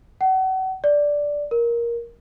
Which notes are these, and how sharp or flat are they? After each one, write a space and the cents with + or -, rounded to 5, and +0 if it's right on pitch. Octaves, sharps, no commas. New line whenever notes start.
F#5 +35
D5 -5
A#4 +10